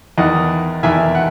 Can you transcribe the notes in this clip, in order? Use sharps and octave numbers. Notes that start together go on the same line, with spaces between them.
E2 D#3 D#5 F#5
E2 D#3 E5 G#5
F#5